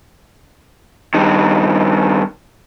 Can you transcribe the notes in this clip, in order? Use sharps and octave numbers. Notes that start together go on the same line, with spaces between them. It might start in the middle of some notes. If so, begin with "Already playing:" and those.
G2 D#3